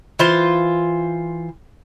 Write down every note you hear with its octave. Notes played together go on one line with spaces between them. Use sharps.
E3 F4 C5